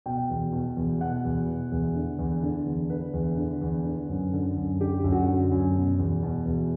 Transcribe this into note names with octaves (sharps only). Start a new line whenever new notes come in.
B2 G5
E2
B2
E2
B2 F#5
E2
B2
E2
D3
E2
D3
E2
D3 B4
E2
D3
E2
D3
F#2
D3
F#2
D3 G4
F#2
F#4
D3
F#2
B2
E2
B2
E2